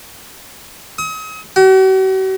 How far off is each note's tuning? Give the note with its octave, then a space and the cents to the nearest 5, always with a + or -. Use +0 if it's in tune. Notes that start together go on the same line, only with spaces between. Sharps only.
D#6 +40
F#4 +45